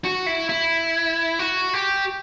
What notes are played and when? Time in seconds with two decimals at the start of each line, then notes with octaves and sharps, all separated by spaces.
0.04 F#4
0.26 E4
0.49 E4
1.39 F#4
1.73 G4